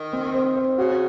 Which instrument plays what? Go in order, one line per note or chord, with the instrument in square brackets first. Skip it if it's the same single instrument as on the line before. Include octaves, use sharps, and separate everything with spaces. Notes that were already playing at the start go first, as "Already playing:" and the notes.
Already playing: [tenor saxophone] D#3
[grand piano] C4
C5
C5
[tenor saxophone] C#3 [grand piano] F#4